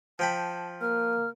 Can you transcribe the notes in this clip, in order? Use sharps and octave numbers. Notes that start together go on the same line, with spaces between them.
F3 G5 A5 B5
A#3 F6